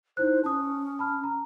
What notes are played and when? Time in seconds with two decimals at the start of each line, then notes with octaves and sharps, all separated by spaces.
0.17 D#4 E4 C5 F#6
0.44 C#4 A5 D#6
0.99 A5 B5 F6
1.24 A#5